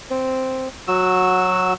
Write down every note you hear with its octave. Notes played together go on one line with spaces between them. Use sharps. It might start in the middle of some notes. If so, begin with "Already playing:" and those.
C4
F#3 F#4 E6